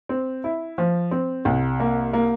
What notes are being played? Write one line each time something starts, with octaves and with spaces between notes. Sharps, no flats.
C4
E4
F3
C4
C2
A#3
A#3